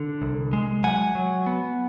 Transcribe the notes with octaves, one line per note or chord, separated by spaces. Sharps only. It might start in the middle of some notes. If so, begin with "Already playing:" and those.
Already playing: D3
C2
G#3
F#3 F#5 G#5
F#3
B3